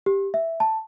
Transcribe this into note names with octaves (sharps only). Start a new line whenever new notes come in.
G4
E5
A5